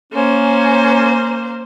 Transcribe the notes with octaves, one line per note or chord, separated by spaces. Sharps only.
A#3 C#4 C5